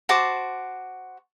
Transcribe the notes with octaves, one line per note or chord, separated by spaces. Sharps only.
F#4 C5 A5 D6